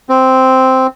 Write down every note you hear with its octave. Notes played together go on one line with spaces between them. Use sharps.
C4